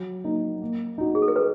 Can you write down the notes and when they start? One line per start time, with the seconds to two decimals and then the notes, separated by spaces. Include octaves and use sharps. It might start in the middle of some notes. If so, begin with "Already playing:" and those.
Already playing: F#3
0.24 A#3 D#4
0.61 A#3
0.98 D#4 F#4
1.15 G#4
1.22 A4
1.28 A#4
1.36 B4